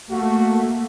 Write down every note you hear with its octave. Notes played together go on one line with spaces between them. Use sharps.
A3 A#3 F#4